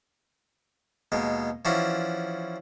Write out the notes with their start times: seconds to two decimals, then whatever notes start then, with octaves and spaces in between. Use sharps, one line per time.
1.12 D#2 B2 G#3
1.65 E3 F3 C#4 D4 F#4 C6